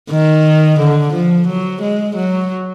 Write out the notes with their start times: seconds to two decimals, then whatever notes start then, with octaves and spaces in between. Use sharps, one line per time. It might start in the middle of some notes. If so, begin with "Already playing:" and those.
0.11 D#3
0.79 D3
1.13 F3
1.47 F#3
1.82 G#3
2.16 F#3